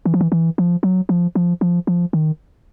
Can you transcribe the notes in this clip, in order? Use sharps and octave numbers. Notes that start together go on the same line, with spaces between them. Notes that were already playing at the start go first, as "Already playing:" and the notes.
E3
F3
E3
E3
F3
F#3
F3
F3
F3
F3
D#3